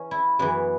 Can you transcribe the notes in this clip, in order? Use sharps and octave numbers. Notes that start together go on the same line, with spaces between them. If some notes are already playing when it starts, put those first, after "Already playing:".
Already playing: E3 C#4
E4
F#2 E3 B3